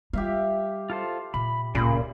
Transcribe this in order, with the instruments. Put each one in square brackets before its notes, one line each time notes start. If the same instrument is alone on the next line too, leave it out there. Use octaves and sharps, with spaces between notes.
[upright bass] G3 [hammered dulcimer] G4 E5 F5
[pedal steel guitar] F4 A4 C5
[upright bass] A#2 [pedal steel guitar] B5
[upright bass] D1 A#3 [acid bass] A#2 [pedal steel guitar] C#3 B5